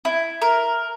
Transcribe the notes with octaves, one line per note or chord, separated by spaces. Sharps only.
E4
A#4